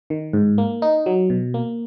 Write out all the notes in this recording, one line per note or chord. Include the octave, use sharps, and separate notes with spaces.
D#3
G#2
A#3
D#4
F#3
B2
A#3